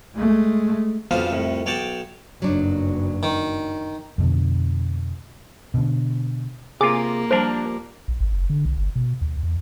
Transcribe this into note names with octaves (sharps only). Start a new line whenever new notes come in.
G#3 A3
B1 F2 C#3 D4 F4 C5
C2 F2 A2
B1 C#5 D5 G5 A5
F#1 G2 F#3 D4 D#4
D#3
F2 B2 D3
B2 D3
C3 A#3 F4 G#4 D6
F3 G3 D4 A#4 C5
A#1
G#1
F#1
D3
B1
G1
B2
D#2
E2